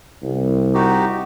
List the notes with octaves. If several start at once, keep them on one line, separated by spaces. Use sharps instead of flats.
C2
D#4 F#4 G4